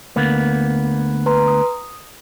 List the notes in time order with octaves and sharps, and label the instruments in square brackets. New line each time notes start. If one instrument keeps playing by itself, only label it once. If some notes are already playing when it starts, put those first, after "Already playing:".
[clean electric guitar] D2 A#3 B3
[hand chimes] B4 A#5 C6
D#6